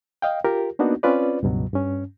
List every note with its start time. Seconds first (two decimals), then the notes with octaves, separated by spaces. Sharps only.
0.22 D#5 F5 G5
0.45 F4 G4 A#4
0.79 A#3 B3 D4 D#4 F#4
1.03 C4 C#4 F4 B4 D5
1.43 C#2 G2 B2 F#3
1.74 G2 C#4